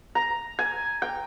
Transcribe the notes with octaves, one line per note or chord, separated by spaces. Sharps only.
A#5
G#5
G5